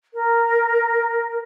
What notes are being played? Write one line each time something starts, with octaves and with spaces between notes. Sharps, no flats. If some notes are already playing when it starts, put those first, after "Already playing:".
A#4